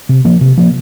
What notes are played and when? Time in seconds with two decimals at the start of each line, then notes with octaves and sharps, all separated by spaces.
0.09 C3
0.25 F3 A#3
0.41 C3
0.58 F3 A#3